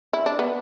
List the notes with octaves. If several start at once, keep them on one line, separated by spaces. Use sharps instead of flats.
E4
D4
B3